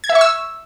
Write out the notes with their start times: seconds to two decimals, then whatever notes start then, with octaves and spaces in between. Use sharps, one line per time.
0.04 G#6
0.09 E5
0.15 C#6
0.21 E6